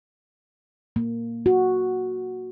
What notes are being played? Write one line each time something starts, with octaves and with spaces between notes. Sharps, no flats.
A#3
F#4